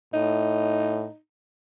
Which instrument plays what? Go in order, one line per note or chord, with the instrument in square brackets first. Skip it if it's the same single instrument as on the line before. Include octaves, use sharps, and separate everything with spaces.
[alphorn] A2 [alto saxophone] D#4